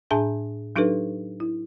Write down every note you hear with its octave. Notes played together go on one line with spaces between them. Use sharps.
A2 D4 G#4 E5 G#5 A5
F#3 D4 D#4 G4 A4 B4
E4